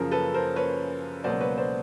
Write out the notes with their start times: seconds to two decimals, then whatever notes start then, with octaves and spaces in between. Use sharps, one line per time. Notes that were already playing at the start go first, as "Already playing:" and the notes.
Already playing: F#2 C#3 F3 A#4
0.11 A4 B4
0.34 A#4 C5
0.56 B4 C#5
1.24 C#2 B2 F#3 A#3 C5 D5
1.41 B4 C#5
1.58 C5 D5